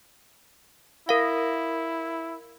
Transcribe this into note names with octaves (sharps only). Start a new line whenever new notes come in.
E4 A#4 F5